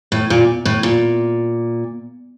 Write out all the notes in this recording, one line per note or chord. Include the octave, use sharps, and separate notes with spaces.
A2
A#2
A2
A#2